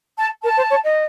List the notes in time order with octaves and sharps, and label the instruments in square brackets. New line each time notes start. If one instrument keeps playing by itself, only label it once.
[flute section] A5
[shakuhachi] A#4 [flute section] A5
[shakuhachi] C5
C#5
D#5